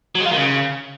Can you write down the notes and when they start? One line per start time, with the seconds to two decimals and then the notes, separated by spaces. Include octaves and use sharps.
0.15 F#3
0.20 G#3
0.26 F4
0.31 D#3
0.36 C#3